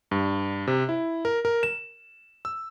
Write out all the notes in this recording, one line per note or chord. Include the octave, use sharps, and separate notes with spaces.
G2
C3
E4
A#4
A#4
E7
E6